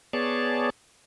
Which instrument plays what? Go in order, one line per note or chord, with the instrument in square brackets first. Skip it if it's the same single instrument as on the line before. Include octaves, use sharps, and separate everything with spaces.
[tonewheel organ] B3 G#4 C#5 D5 A5